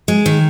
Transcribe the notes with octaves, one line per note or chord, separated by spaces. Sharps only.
G#3
D#3